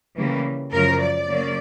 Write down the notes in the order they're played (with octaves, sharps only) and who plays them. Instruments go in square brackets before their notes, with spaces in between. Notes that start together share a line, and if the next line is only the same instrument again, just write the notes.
[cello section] C#3 E3 G3 A#3
F#2 C#3 F3 A#4
D5
C#3 F#3 A#3 C#4